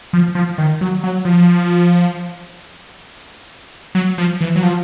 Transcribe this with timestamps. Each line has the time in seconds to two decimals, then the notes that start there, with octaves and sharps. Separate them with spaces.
0.13 F3
0.35 F3
0.58 D#3
0.81 F#3
1.04 F#3
1.25 F3
3.95 F#3
4.18 F3
4.41 E3
4.56 F#3
4.63 F3